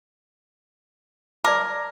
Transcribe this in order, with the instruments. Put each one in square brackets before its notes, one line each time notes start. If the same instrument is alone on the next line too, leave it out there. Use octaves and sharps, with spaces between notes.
[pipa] A#4 [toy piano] D5 A5 D6